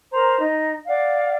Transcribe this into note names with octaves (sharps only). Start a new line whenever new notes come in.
A#4 C5 A#5
D#4
D5 F5 F#5